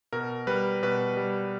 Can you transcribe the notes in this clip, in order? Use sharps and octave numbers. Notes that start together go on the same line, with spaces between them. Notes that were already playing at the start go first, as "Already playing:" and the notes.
B2 A#4
G3 B4
B2 B4
G3